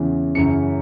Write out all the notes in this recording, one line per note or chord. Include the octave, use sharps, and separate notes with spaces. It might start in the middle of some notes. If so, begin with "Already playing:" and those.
Already playing: E2 C#3 E3
F#2 C#3 E3 C#7